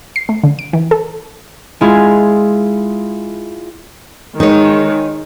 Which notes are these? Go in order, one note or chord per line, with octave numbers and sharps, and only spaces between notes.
C7
A3
D3
D7
E3
A4
G#3 E4 F4 G#4
D#3 G#3 D#4 C#5